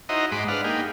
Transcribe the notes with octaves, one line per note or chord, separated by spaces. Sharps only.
D#4 E4 F#4 C5 D#5 A#5
G#2 G#3 B5 C6 D6
D4 B4 F5 F#5
A#3 D#4 G4 G#4